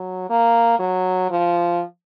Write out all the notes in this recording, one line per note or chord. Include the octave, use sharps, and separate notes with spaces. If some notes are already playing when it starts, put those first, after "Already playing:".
Already playing: F#3
A#3
F#3
F3